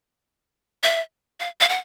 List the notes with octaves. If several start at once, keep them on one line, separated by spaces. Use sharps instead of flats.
E5
F5
F5
F#5